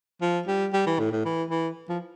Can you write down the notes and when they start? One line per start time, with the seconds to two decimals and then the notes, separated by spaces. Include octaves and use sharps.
0.21 F3
0.48 G3
0.73 G3
0.87 E3
0.99 A2
1.12 A2
1.25 E3
1.50 E3
1.89 F3